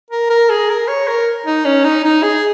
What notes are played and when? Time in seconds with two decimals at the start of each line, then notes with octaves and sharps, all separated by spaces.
0.11 A#4
0.30 A#4
0.49 G#4
0.69 A#4
0.88 C#5
1.07 A#4
1.46 D#4
1.65 C#4
1.84 D#4
2.04 D#4
2.23 G#4